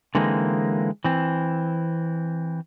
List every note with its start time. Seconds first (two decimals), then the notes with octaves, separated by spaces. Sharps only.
0.15 D3 E3 G#3 A#3 C4 D#4
1.04 E3 C4